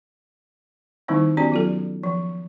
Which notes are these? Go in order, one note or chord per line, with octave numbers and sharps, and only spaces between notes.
D#3 G3 A#3 C4 D#4 E4
B3 C#4 F#4 G4 D5
F#3 F4 A4
F3